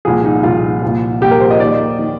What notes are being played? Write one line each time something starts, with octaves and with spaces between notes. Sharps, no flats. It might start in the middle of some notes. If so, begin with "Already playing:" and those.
C2 A#2 F3 G#4
D#4
C2 A#2 F3 F4
C2 A#2 F3
C2 A#2 F3 G4
A#4
C5
D#5
D#2 D#3 D5
D#3